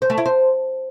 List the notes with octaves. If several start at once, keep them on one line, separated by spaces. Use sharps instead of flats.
C5
A3
E4
C5